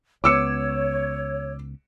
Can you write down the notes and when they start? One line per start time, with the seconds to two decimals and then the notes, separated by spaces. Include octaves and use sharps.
0.24 C#2 B3 C#5 D6 E6 C#7